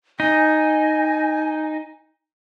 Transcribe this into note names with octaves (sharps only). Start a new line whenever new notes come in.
D#4 G#5